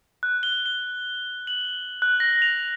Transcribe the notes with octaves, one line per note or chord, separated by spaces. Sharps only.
F#6
G7
G7
F#7
F#6
A#6
F7